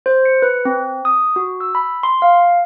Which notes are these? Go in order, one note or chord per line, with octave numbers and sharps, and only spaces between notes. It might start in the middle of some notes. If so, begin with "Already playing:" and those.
C5
C#7
B4
C4
D#6
F#4
E6
B5
C6
F5